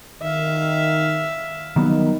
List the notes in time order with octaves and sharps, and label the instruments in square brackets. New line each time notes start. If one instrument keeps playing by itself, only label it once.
[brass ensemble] D#3 [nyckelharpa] E5 F5
[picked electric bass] D#3 F#3 B3 [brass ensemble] G3 A#3 D#4